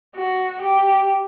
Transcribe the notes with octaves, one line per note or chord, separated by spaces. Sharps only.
F#4
G4